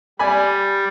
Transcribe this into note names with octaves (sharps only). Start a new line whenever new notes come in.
G3 D5 G#5 B5